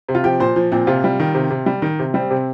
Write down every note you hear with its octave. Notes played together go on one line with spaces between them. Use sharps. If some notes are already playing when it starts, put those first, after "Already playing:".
C3
F4
F3 G4
A#2 C5
F3
A#2 C4
C3 F4
G3
D#3
C3
C3
G3
D#3
C3
G3 C4
C3